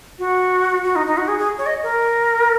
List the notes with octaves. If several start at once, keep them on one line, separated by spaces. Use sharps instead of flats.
F#4
F#4
D#4
D#4
F#4
G#4
G#4
C#5
D#5
A#4